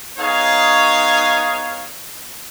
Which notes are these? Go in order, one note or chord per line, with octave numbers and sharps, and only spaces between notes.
B3 D#4 G#4 C#5 F5